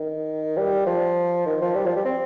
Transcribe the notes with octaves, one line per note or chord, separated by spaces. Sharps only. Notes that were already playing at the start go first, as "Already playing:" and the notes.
Already playing: D#3
G3
F3
D#3
F3
G3
F3
G3
C4